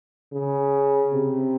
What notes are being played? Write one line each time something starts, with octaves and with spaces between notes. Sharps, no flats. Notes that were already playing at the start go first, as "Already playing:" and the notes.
C#3
C3